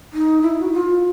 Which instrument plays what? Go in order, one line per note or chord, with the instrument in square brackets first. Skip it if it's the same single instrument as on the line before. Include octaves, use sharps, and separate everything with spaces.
[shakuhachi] D#4
E4
F#4
F4